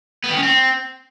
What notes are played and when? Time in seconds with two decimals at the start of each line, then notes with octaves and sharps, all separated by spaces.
0.24 B3
0.30 D#3
0.36 C#4
0.43 C4